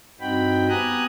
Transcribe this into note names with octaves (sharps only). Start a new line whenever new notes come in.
G2 C4 D#4 F#4 G5 B5
B3 G4 G#5 A#5 D#6 F#6